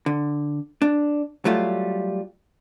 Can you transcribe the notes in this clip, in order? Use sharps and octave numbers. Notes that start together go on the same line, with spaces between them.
D3
D4
F#3 G3 A3 F4